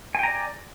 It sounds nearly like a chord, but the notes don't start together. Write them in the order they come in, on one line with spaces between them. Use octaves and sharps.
G#5 G5 A#5 D5